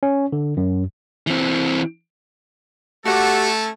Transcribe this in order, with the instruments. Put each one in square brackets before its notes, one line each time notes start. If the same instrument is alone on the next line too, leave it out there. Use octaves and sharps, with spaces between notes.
[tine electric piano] C#4
D3
F#2
[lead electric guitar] E3 C4
[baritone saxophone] A3 [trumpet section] C#4 A4 [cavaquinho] F#4 F#5 D6 [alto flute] G4